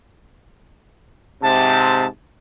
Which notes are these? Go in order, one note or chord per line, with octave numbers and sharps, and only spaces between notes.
G#2 C3 A5